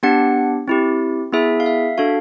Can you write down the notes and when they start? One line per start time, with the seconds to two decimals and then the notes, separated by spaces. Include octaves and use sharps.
0.03 B3 D4 G4 F#5
0.68 C4 E4 G4
1.32 B3 E4 G#4 E5
1.60 F5
1.66 E5
1.98 D4 F#4 A4 F5